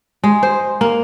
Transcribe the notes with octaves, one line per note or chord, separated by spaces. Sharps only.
G#3
C5
A#3